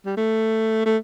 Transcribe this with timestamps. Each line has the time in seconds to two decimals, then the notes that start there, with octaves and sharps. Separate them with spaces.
0.06 G3
0.17 A3
0.86 A3